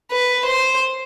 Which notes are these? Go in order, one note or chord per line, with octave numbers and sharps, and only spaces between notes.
B4
C5